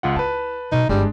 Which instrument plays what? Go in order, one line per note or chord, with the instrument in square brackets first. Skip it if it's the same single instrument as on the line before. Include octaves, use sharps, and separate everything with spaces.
[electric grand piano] C#2 F4 F#5
[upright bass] E4 [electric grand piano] B4 A5
[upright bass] B2 [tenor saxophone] D#4
[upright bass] G1 E4 [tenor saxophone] G3 [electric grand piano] G#3 D4